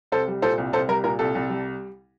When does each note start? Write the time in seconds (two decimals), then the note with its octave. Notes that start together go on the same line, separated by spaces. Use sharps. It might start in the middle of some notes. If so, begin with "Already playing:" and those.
0.12 C2 A4 C5
0.28 G3
0.42 A#2 A4 C5
0.58 C2
0.73 C2 A4 C5
0.88 G3 A#4
1.04 A#2 A#4
1.19 C2 A4
1.35 C2
1.50 G3